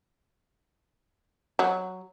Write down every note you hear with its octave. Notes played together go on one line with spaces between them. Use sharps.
F#3